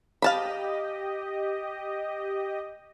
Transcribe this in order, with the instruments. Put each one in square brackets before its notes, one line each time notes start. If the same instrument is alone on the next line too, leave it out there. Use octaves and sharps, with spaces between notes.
[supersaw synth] G4 D#5 [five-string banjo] F5 A5 B5